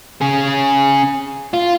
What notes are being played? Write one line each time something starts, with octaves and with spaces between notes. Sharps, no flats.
C#4 G#4
F4